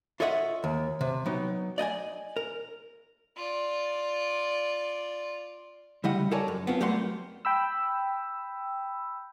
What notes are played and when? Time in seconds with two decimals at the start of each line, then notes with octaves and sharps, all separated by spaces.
0.20 F4 A4 C#5 D#5 E5 F#5
0.64 D#2
1.01 C3
1.26 F#3 B3 D#4 G5
1.78 D5 D#5 G5 G#5
2.36 A#4
3.37 F4 D5
6.04 D2 C#3 G3 E4 D#5 F#5
6.31 A4 A#4 C#5 D5 G#5 A5
6.48 F#2
6.67 B3 C4 F4
6.80 F#3 G3 A3 A#3 F#5 C6
7.45 G5 B5 E6